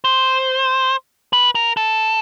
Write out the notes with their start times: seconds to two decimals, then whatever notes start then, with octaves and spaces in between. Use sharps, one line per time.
0.05 C5
1.33 B4
1.55 A#4
1.77 A4